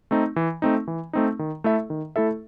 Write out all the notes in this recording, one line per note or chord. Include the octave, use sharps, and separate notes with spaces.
A3 C4 D#4
E3
A3 C4 D#4
E3
A3 C4 D#4
D#3
A3 E4 A4 E5
D#3
A3 E4 A4 E5